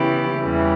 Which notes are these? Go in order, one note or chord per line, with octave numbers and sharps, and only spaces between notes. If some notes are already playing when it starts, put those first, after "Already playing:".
Already playing: C#3 E3 B3 E4 G4
E2 C#3 E3 G3